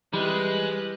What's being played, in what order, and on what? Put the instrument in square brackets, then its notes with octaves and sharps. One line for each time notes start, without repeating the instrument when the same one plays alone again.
[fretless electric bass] E3 [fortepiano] G3 [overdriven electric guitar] G#3 [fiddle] B4 F#6